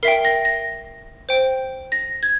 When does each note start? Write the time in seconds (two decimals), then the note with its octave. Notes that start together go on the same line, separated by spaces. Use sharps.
0.03 A#4 E5 G5 C7
0.25 A#6
0.45 A#6
1.29 C5 G5
1.92 A#6
2.23 G#6